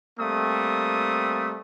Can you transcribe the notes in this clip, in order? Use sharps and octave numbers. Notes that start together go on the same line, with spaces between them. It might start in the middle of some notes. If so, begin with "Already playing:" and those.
G3 A3 A#3 C4 D#6